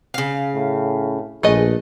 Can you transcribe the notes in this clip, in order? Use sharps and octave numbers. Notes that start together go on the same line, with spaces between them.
C#3 F5
A2
A#1 A3 G#4 B4 D#5